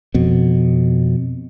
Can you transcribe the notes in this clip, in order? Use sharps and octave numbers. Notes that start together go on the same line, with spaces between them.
F2 B2